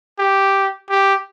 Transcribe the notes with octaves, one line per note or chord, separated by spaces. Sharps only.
G4
G4